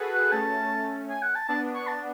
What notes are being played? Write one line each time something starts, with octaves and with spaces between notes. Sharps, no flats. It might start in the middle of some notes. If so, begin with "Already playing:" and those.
Already playing: F#4 G#4 A4 B4
F#5
A3 C#4 A5
G#5
F#5
A5
B3 D4 A5
C#6
A5